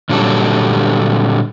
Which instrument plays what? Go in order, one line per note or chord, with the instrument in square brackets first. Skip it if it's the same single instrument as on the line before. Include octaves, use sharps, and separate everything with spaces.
[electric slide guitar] A#2 D3 F#3 G3 G4 A4